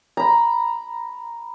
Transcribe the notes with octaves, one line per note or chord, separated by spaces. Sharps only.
A#5 B5